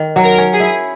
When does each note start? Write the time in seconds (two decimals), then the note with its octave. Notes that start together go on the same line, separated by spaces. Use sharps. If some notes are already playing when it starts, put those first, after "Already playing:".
Already playing: D#3
0.16 F#3
0.23 A#4
0.38 C#4
0.53 G#4
0.60 E4